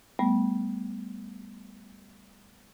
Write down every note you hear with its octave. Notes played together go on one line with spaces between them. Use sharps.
G3 A3 B3